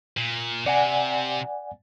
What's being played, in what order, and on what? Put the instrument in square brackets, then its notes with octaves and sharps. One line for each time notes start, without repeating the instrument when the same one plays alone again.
[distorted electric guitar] A#2
[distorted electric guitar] C3 [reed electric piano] D5 F#5 G#5